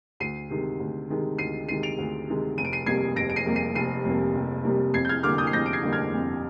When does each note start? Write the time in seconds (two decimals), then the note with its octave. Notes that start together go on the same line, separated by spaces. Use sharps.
0.20 D2 C7 D#7
0.50 C3 D#3 G#3
0.80 D2
1.09 C3 D#3 G#3
1.38 D2 C7 D#7
1.68 C3 D#3 G#3 C7 D#7
1.83 D7 F7
1.98 D2
2.28 C3 D#3 G#3
2.57 F1 D#7
2.65 D7
2.73 C7 D#7
2.86 F2 C3 G3 A#3 G#6 C7
3.16 F1 A#6 D7
3.30 D7
3.36 C7 D#7
3.46 F2 C3 G3 A#3
3.56 C7 D#7
3.75 F1 C7 D#7
4.05 F2 C3 G3 A#3
4.35 F1
4.64 F2 C3 G3 A#3
4.94 F2 G#6 C7
5.05 G6
5.09 F6 G#6
5.23 D3 G3 A#3 D6 F6
5.38 D#6 G6
5.47 C7
5.53 F2 G6 A#6
5.66 D7
5.73 G#6 C7
5.83 D3 G3 A#3
5.93 F6 G#6
6.13 F2